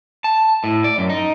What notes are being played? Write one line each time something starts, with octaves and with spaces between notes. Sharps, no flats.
A5
A2
D5
F#2
D#4